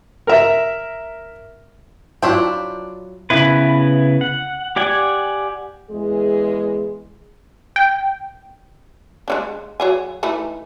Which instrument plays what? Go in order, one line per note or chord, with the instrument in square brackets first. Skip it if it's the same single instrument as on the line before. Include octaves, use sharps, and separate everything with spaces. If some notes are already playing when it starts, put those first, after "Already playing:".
[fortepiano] A#4 E5
[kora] F#3 E4 F4 [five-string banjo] D4 C5 G5
[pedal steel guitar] C#3 B3 E4 B4
F#5
G4 D5 F#5 G#5
[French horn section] E2 G#3 G#4
[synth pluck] G5
[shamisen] G#3 C#4 D4
F#3 G#4 G#5
E3 A3 D#4